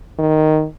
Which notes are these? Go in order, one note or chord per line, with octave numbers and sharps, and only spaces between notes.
D#3